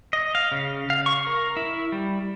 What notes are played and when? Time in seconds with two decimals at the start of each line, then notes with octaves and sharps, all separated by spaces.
0.13 D#5
0.35 F5
0.52 C#3
0.90 F5
1.06 C#6
1.27 A#4
1.57 E4
1.92 G3